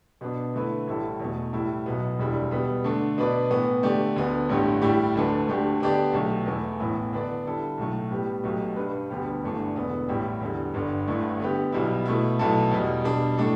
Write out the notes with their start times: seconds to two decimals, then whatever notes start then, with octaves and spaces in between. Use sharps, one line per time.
0.21 B2 B3 D4
0.54 D3 A3 E4 B4
0.87 A1 A2 G3 E4 A4
1.20 E2 B2 A3
1.53 A2 G3 E4
1.86 B1 B2 B3
2.19 E1 D2 D3 G3 E4
2.51 B2 G3 B3
2.84 D3 A3 D4
3.18 B2 B3 D4 B4 D5
3.50 A2 E3 B3
3.83 D3 A3 G4 D5
4.16 D2 D3 B3
4.49 A1 G2 D3 A3 G4
4.82 A2 G3 E4 G4 D5
5.15 D2 D3 A3 D4 B4
5.48 D2 D3 A3 D4 G4
5.80 D3 B3 D4 G4 D5
6.13 B1 B2 A3 G4
6.46 E2 E3 A3 E4
6.80 A1 A2 E3 B3 E4
7.13 D3 B3 D4 B4 D5
7.45 D3 G3 E4 A4
7.78 B1 A2 A3
8.10 A2 G3 B3 G4
8.43 B1 B2 A3 G4
8.76 G2 G3 D4 B4
9.10 D2 D3 G3 B3 G4
9.43 G1 G2 E3 A3 D4
9.75 E1 E2 D3 B3
10.08 A1 A2 G3 E4 G4
10.41 E2 D3 G3
10.74 G1 G2 D3
11.07 G1 G2 D3 A3 E4
11.40 D3 B3 G4
11.72 B1 B2 G3 E4
12.06 B2 A3 E4
12.39 B1 B2 A3 E4 A4
12.72 E2 B2 G3
13.04 B2 G3 D4
13.38 A2 A3 D4 A4